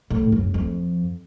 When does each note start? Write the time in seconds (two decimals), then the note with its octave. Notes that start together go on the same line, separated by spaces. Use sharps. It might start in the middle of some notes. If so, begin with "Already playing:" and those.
0.10 A2
0.32 F#2
0.54 F2